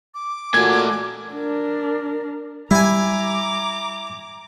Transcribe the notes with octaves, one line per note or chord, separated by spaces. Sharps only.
D6
A#2 A3 F#4 G#5 G#6
D4 A#4
G3 E4 G#5 A#5 D6